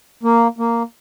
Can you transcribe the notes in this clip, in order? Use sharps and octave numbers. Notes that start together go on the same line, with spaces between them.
A#3
A#3